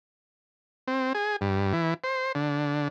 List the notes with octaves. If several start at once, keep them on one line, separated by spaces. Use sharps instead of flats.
C4
G#4
G2
E3
C5
D3